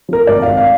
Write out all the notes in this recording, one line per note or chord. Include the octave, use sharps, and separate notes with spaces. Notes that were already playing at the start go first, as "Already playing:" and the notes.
F3 A#4
G#1 D5
G#1 F5
F5